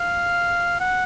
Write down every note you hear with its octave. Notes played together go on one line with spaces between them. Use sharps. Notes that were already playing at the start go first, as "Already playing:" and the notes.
Already playing: F5
F#5